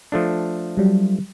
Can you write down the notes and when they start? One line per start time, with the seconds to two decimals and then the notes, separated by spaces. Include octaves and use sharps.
0.12 F3 A3 D4
0.77 F#3 G3